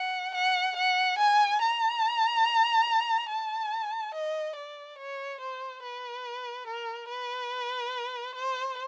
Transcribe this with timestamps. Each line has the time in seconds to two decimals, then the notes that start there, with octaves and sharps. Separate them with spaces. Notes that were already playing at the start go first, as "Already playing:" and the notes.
Already playing: F#5
0.35 F#5
0.77 F#5
1.18 G#5
1.62 A#5
3.29 A5
4.14 D#5
4.56 D5
4.98 C#5
5.41 C5
5.82 B4
6.67 A#4
7.09 B4
8.35 C5